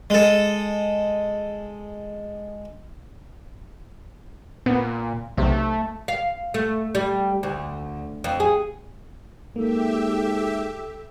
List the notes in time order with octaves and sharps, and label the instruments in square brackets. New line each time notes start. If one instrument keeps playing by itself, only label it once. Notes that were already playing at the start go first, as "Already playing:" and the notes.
[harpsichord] G#3 A4
[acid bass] A#2 [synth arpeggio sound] B3
[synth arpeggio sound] B1 C3 [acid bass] A3
[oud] F5
A3
G3
D2
F2
G#4
[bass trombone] G#2 [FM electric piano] A#3 [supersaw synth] G4 E5 [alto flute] A4